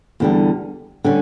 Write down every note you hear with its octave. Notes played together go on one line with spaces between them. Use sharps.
E2 D3 G3
D3 G3 C#4